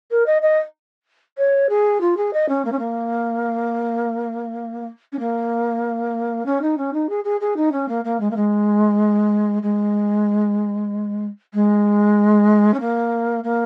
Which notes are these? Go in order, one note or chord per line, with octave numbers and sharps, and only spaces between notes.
A#4
D#5
D#5
C#5
G#4
F4
G#4
D#5
C#4
A#3
C#4
A#3
C#4
A#3
C#4
D#4
C#4
D#4
G#4
G#4
G#4
D#4
C#4
A#3
A#3
G#3
A#3
G#3
G#3
G#3
C#4
A#3
A#3